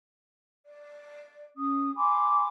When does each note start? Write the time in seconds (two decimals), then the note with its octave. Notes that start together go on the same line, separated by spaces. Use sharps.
0.66 D5
1.56 C#4 D#6
1.95 G#5 B5 C6 D6